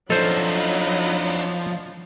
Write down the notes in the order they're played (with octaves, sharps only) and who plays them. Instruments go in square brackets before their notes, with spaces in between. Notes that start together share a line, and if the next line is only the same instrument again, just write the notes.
[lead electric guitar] F3 [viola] F#3 B5 [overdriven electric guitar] D4 D#4 [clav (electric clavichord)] A4 C5